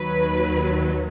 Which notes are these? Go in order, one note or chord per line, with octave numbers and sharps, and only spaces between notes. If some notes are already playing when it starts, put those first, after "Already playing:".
Already playing: D#2 D#3 F#3 B4